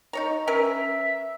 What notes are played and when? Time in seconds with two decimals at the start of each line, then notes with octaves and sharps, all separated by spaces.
0.13 D#4 C#5 A#5
0.48 C#4 A#4 B4 E5